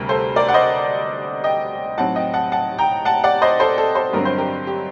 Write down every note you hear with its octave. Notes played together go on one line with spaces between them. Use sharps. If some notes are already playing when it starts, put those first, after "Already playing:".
Already playing: D2 C3 G3 G4 A#4
A4 C5
A#4 D5
F#5
C5 D#5
D#5 G5
A2 F#3 C4 D#4 F#5 A5
D#5 G5
F#5 A5
F#5 A5
G5 A#5
F#5 A5
D5 F#5
C5 D#5
A4 C5
A4
A4 C5
G2 D3 F#3 C4 A#4
C5
G4 A#4
G4